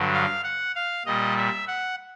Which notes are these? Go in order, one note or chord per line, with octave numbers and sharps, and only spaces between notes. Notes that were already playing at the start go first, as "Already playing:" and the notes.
Already playing: G2 D3 F#3
F5
F#5
F5
A#2 G3 D#5
E5
F#5